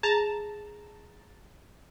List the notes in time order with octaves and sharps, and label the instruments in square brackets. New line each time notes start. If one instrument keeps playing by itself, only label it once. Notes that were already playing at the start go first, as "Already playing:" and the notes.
[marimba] G#4 [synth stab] A5 A#5